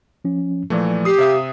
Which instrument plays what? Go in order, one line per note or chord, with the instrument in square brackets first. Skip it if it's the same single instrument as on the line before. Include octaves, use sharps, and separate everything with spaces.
[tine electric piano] F3 C#4
[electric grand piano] A#2 E3 A3 [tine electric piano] F3 D5
[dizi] G4 [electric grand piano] D#6 C7
[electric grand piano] C3 E5 D#6 [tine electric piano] F5